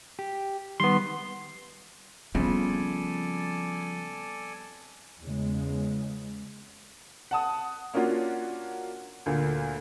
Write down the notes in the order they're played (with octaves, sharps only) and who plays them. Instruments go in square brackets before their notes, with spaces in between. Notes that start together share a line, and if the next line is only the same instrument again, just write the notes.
[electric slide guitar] G4
[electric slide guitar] D#3 G3 [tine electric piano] B3 C6
[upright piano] C#3 [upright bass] F3 [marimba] G3 B3 C4 [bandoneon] A4 D5 G#5
[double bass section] E2 C#3 G#3
[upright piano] F#5 A5 D#6
A#3 C#4 D4 F4 F#4
D2 A#2 D3